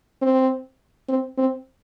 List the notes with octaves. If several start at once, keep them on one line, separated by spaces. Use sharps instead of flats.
C4
C4
C4